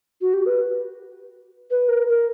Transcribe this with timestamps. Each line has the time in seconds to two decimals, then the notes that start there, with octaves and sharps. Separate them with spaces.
0.21 F#4
0.34 G4
0.46 B4
1.71 B4
1.88 A#4
2.08 A#4